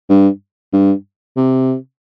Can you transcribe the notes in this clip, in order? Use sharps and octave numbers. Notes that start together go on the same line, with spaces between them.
G2
G2
C3